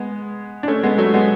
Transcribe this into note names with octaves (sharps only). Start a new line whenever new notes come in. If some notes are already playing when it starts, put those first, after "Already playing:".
Already playing: G#3 B3
D4
A3 C#4
G#3 B3
F#3 A3
G#3 B3